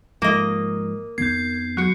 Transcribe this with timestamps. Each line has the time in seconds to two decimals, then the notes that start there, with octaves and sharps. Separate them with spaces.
0.22 G#2 F3 A#3 D#5
1.18 F2 D#3 B3 G6 G#6 C7
1.77 F#3 F#4 F#6 C#7